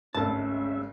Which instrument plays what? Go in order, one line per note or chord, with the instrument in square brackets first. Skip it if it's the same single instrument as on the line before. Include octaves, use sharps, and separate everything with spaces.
[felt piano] G#1 D2 [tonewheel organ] G#3 E5 [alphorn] C#4 [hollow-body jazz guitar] A5